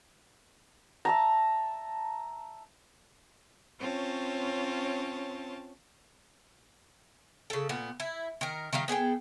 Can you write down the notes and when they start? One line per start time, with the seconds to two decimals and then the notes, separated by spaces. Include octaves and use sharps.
1.05 E5 A5 A#5
3.79 C4 C#4 F4 C#5 A5
7.50 C#3 A4
7.69 A#2 B3
8.00 E4
8.41 D#3 A#4
8.73 D#3 G3 D#4 F5
8.88 B3 G#4 A4 G5